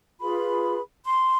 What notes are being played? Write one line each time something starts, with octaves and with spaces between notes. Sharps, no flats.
F4 G#4 B4 B5
C6